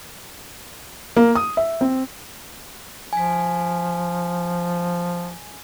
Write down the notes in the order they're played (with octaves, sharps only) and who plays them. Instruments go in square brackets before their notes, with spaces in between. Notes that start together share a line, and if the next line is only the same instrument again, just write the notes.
[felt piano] A#3
D#6
E5
C4
[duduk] F3 [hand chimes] G#5 B6